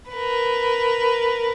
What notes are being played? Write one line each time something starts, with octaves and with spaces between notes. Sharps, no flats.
A#4 B4